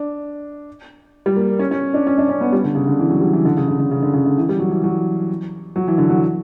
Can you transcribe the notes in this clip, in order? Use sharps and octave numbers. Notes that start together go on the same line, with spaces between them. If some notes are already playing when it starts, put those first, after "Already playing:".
Already playing: D4
G3
A#3
C#4
C#4
D4
C#4
D4
C#4
B3
G3
D3
C#3
D3
E3
F#3
G3
E3
D3
C#3
D3
D3
C#3
D3
C#3
D3
E3
G3
F#3
E3
F#3
F#3
E3
D3
F#3